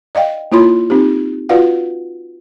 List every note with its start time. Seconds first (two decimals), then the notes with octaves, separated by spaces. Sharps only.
0.15 D5 D#5 F5 G5
0.52 A#3 E4 F4 C#5 B5 C6
0.90 C4 D#4 G4
1.49 F4 F#4 B4 D5 F5 F#5